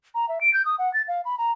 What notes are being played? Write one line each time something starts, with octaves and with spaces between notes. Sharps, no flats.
A#5
E5
D7
G6
D#6
F#5
A6
F5
B5
A#5